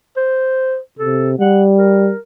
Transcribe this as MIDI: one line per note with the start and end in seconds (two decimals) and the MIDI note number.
0.17 0.78 72
0.99 1.35 48
0.99 1.31 69
1.39 2.12 55
1.39 1.64 78
1.78 2.19 70